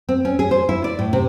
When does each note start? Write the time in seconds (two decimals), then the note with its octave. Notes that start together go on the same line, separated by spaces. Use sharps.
0.09 C4
0.25 C#4
0.39 G#4
0.51 C5
0.69 E4
0.84 D5
0.99 A2
1.13 C3